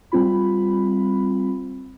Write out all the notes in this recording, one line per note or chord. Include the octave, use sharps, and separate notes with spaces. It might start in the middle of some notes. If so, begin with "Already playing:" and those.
G3 C4 F4 B5